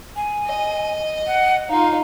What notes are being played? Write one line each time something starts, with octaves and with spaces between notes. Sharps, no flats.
G#5
D#5
F#5
D#4 F4 F5